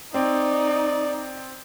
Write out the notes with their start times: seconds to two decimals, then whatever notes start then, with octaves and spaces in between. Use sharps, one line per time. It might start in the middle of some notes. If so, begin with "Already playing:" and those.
0.14 C4 D#4 D5